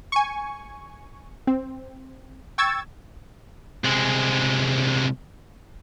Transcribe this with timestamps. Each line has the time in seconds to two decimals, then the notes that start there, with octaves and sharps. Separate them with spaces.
0.12 G#5 C#6
1.47 C4
2.58 G5 C#6 E6 G#6 A6
3.85 C2 G#3